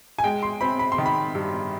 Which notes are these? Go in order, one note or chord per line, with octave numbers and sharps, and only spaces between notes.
G#5
G#3 G5
C6
C4 B5
B5
C6
D#3
B5
G2